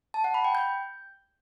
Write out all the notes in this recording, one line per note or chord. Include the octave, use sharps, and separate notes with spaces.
A5
F#5
B5
G5
G6